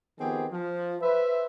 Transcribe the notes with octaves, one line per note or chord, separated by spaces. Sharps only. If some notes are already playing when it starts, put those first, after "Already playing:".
D#3 F3 B3 C4 G4 G#4
F3
B4 C5 E5